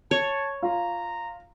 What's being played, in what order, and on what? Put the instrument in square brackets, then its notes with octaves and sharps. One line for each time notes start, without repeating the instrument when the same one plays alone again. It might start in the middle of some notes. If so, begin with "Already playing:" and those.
[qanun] C#5 [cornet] A5
[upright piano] F4 [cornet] A#5